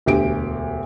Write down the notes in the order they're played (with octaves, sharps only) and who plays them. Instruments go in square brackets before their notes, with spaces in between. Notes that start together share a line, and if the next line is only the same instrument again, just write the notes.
[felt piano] E1 D2 G4 D7